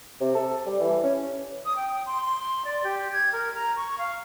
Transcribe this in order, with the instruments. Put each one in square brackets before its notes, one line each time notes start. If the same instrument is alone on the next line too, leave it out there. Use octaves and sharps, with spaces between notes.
[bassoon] C3
A4
G3
E3
C#4
[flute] D#6
G5
C6
C6
D5
G4
G#6
A#4
A#5
C#6
F5